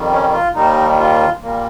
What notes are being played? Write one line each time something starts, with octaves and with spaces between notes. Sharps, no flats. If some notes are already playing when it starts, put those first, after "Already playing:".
Already playing: F2 D#3 G3
C#4
F4
D#2 D#3 G3 D#4
F4
A#2 G3 A#3